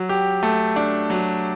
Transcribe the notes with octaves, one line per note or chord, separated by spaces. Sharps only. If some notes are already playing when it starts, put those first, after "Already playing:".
Already playing: F#3
G4
A3
D4
F#3